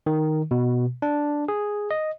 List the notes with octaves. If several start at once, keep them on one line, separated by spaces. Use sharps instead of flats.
D#3
B2
D4
G#4
D#5